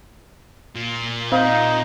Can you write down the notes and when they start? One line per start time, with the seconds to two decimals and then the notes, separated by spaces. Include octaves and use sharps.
0.75 A#2
1.32 C4 D#4 F5